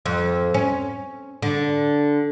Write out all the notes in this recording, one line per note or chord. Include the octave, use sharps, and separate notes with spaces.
F2
C#4
D3